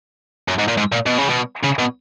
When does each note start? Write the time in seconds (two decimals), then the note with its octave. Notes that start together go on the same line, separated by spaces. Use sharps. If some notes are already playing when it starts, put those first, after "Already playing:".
0.48 F#2
0.58 G#2
0.68 A#2
0.77 G#2
0.92 A#2
1.06 B2
1.18 C#3
1.30 B2
1.64 C#3
1.79 B2